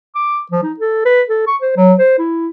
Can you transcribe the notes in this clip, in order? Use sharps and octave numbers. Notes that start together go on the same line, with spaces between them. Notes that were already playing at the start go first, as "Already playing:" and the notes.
D6
F3
D#4
A4
B4
A4
C#6
C5
F#3
C5
E4